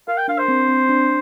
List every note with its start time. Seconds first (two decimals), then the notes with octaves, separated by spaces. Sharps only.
0.08 A#4 F5
0.17 G5
0.28 D4 F5
0.38 C5
0.48 C4
0.69 C4
0.89 D4